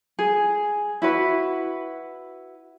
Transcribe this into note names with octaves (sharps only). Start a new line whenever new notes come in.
G#4
E4 F#4 B4